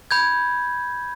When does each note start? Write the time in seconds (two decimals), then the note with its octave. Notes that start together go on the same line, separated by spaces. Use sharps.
0.11 B5 G6 G#6